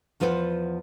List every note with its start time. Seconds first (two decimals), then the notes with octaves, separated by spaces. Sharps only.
0.20 E2 F3 B4 C5 D5 F#5